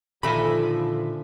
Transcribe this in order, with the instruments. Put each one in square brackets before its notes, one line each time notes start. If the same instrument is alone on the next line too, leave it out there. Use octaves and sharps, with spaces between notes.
[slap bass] A#2 D#3 [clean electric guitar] D3 E5 G#5 [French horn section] F3 [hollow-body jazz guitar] A4 B5